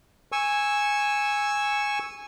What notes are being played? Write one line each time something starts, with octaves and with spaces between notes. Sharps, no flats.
G#5 C#6 E6